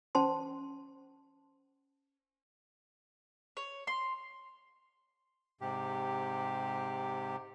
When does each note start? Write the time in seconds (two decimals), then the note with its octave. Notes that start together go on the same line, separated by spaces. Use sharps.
0.15 C#4 C5 A5 C6
3.57 C#5
3.87 C6
5.61 G#2 C3 G4